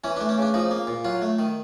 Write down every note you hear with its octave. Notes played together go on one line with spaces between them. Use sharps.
E3 C#4
D4
A3
C#4
C#3 D4
F3 D#4
A#3
A#2
F#3 F4
A3
D#3